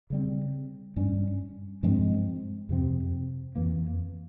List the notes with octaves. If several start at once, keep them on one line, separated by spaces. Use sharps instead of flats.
C#3 G3 C4
G2 G3 C#4
G2 F3 G#3 C4
F2 C3 F3 C4
F2 E3 A#3